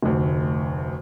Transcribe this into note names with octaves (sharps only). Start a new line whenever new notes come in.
F1 D2